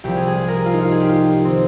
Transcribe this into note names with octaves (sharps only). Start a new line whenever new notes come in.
C2 C3 F3 G4
G#4
G#4
G#4
A#4
G#4
F4
D#4
F4
G#4
G4
F4
F4
D#4
D#3 C4